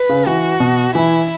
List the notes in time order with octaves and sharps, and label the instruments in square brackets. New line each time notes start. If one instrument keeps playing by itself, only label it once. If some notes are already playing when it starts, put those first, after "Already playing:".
Already playing: [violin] B4
[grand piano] C#3
[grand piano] E3 [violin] F#4
[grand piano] B2
[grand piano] E3 [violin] E4